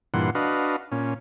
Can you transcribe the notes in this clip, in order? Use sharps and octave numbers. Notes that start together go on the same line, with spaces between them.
G2 A#2 E3 F#5 C6
D4 F#4 B4 D#5 F5
A#2 C#4